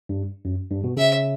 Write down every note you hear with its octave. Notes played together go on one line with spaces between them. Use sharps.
G2
F#2
G2
B2
C#3 E5